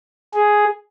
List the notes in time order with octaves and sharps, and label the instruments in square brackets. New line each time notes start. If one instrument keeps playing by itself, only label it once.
[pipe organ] G#4